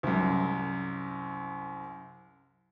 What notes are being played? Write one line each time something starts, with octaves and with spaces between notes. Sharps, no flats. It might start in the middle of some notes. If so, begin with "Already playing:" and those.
C2 F#2